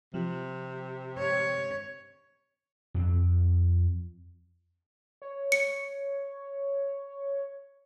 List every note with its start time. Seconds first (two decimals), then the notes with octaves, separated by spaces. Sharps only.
0.14 C3 F3
1.18 C#5
2.94 F2 C4
5.22 C#5
5.52 C#7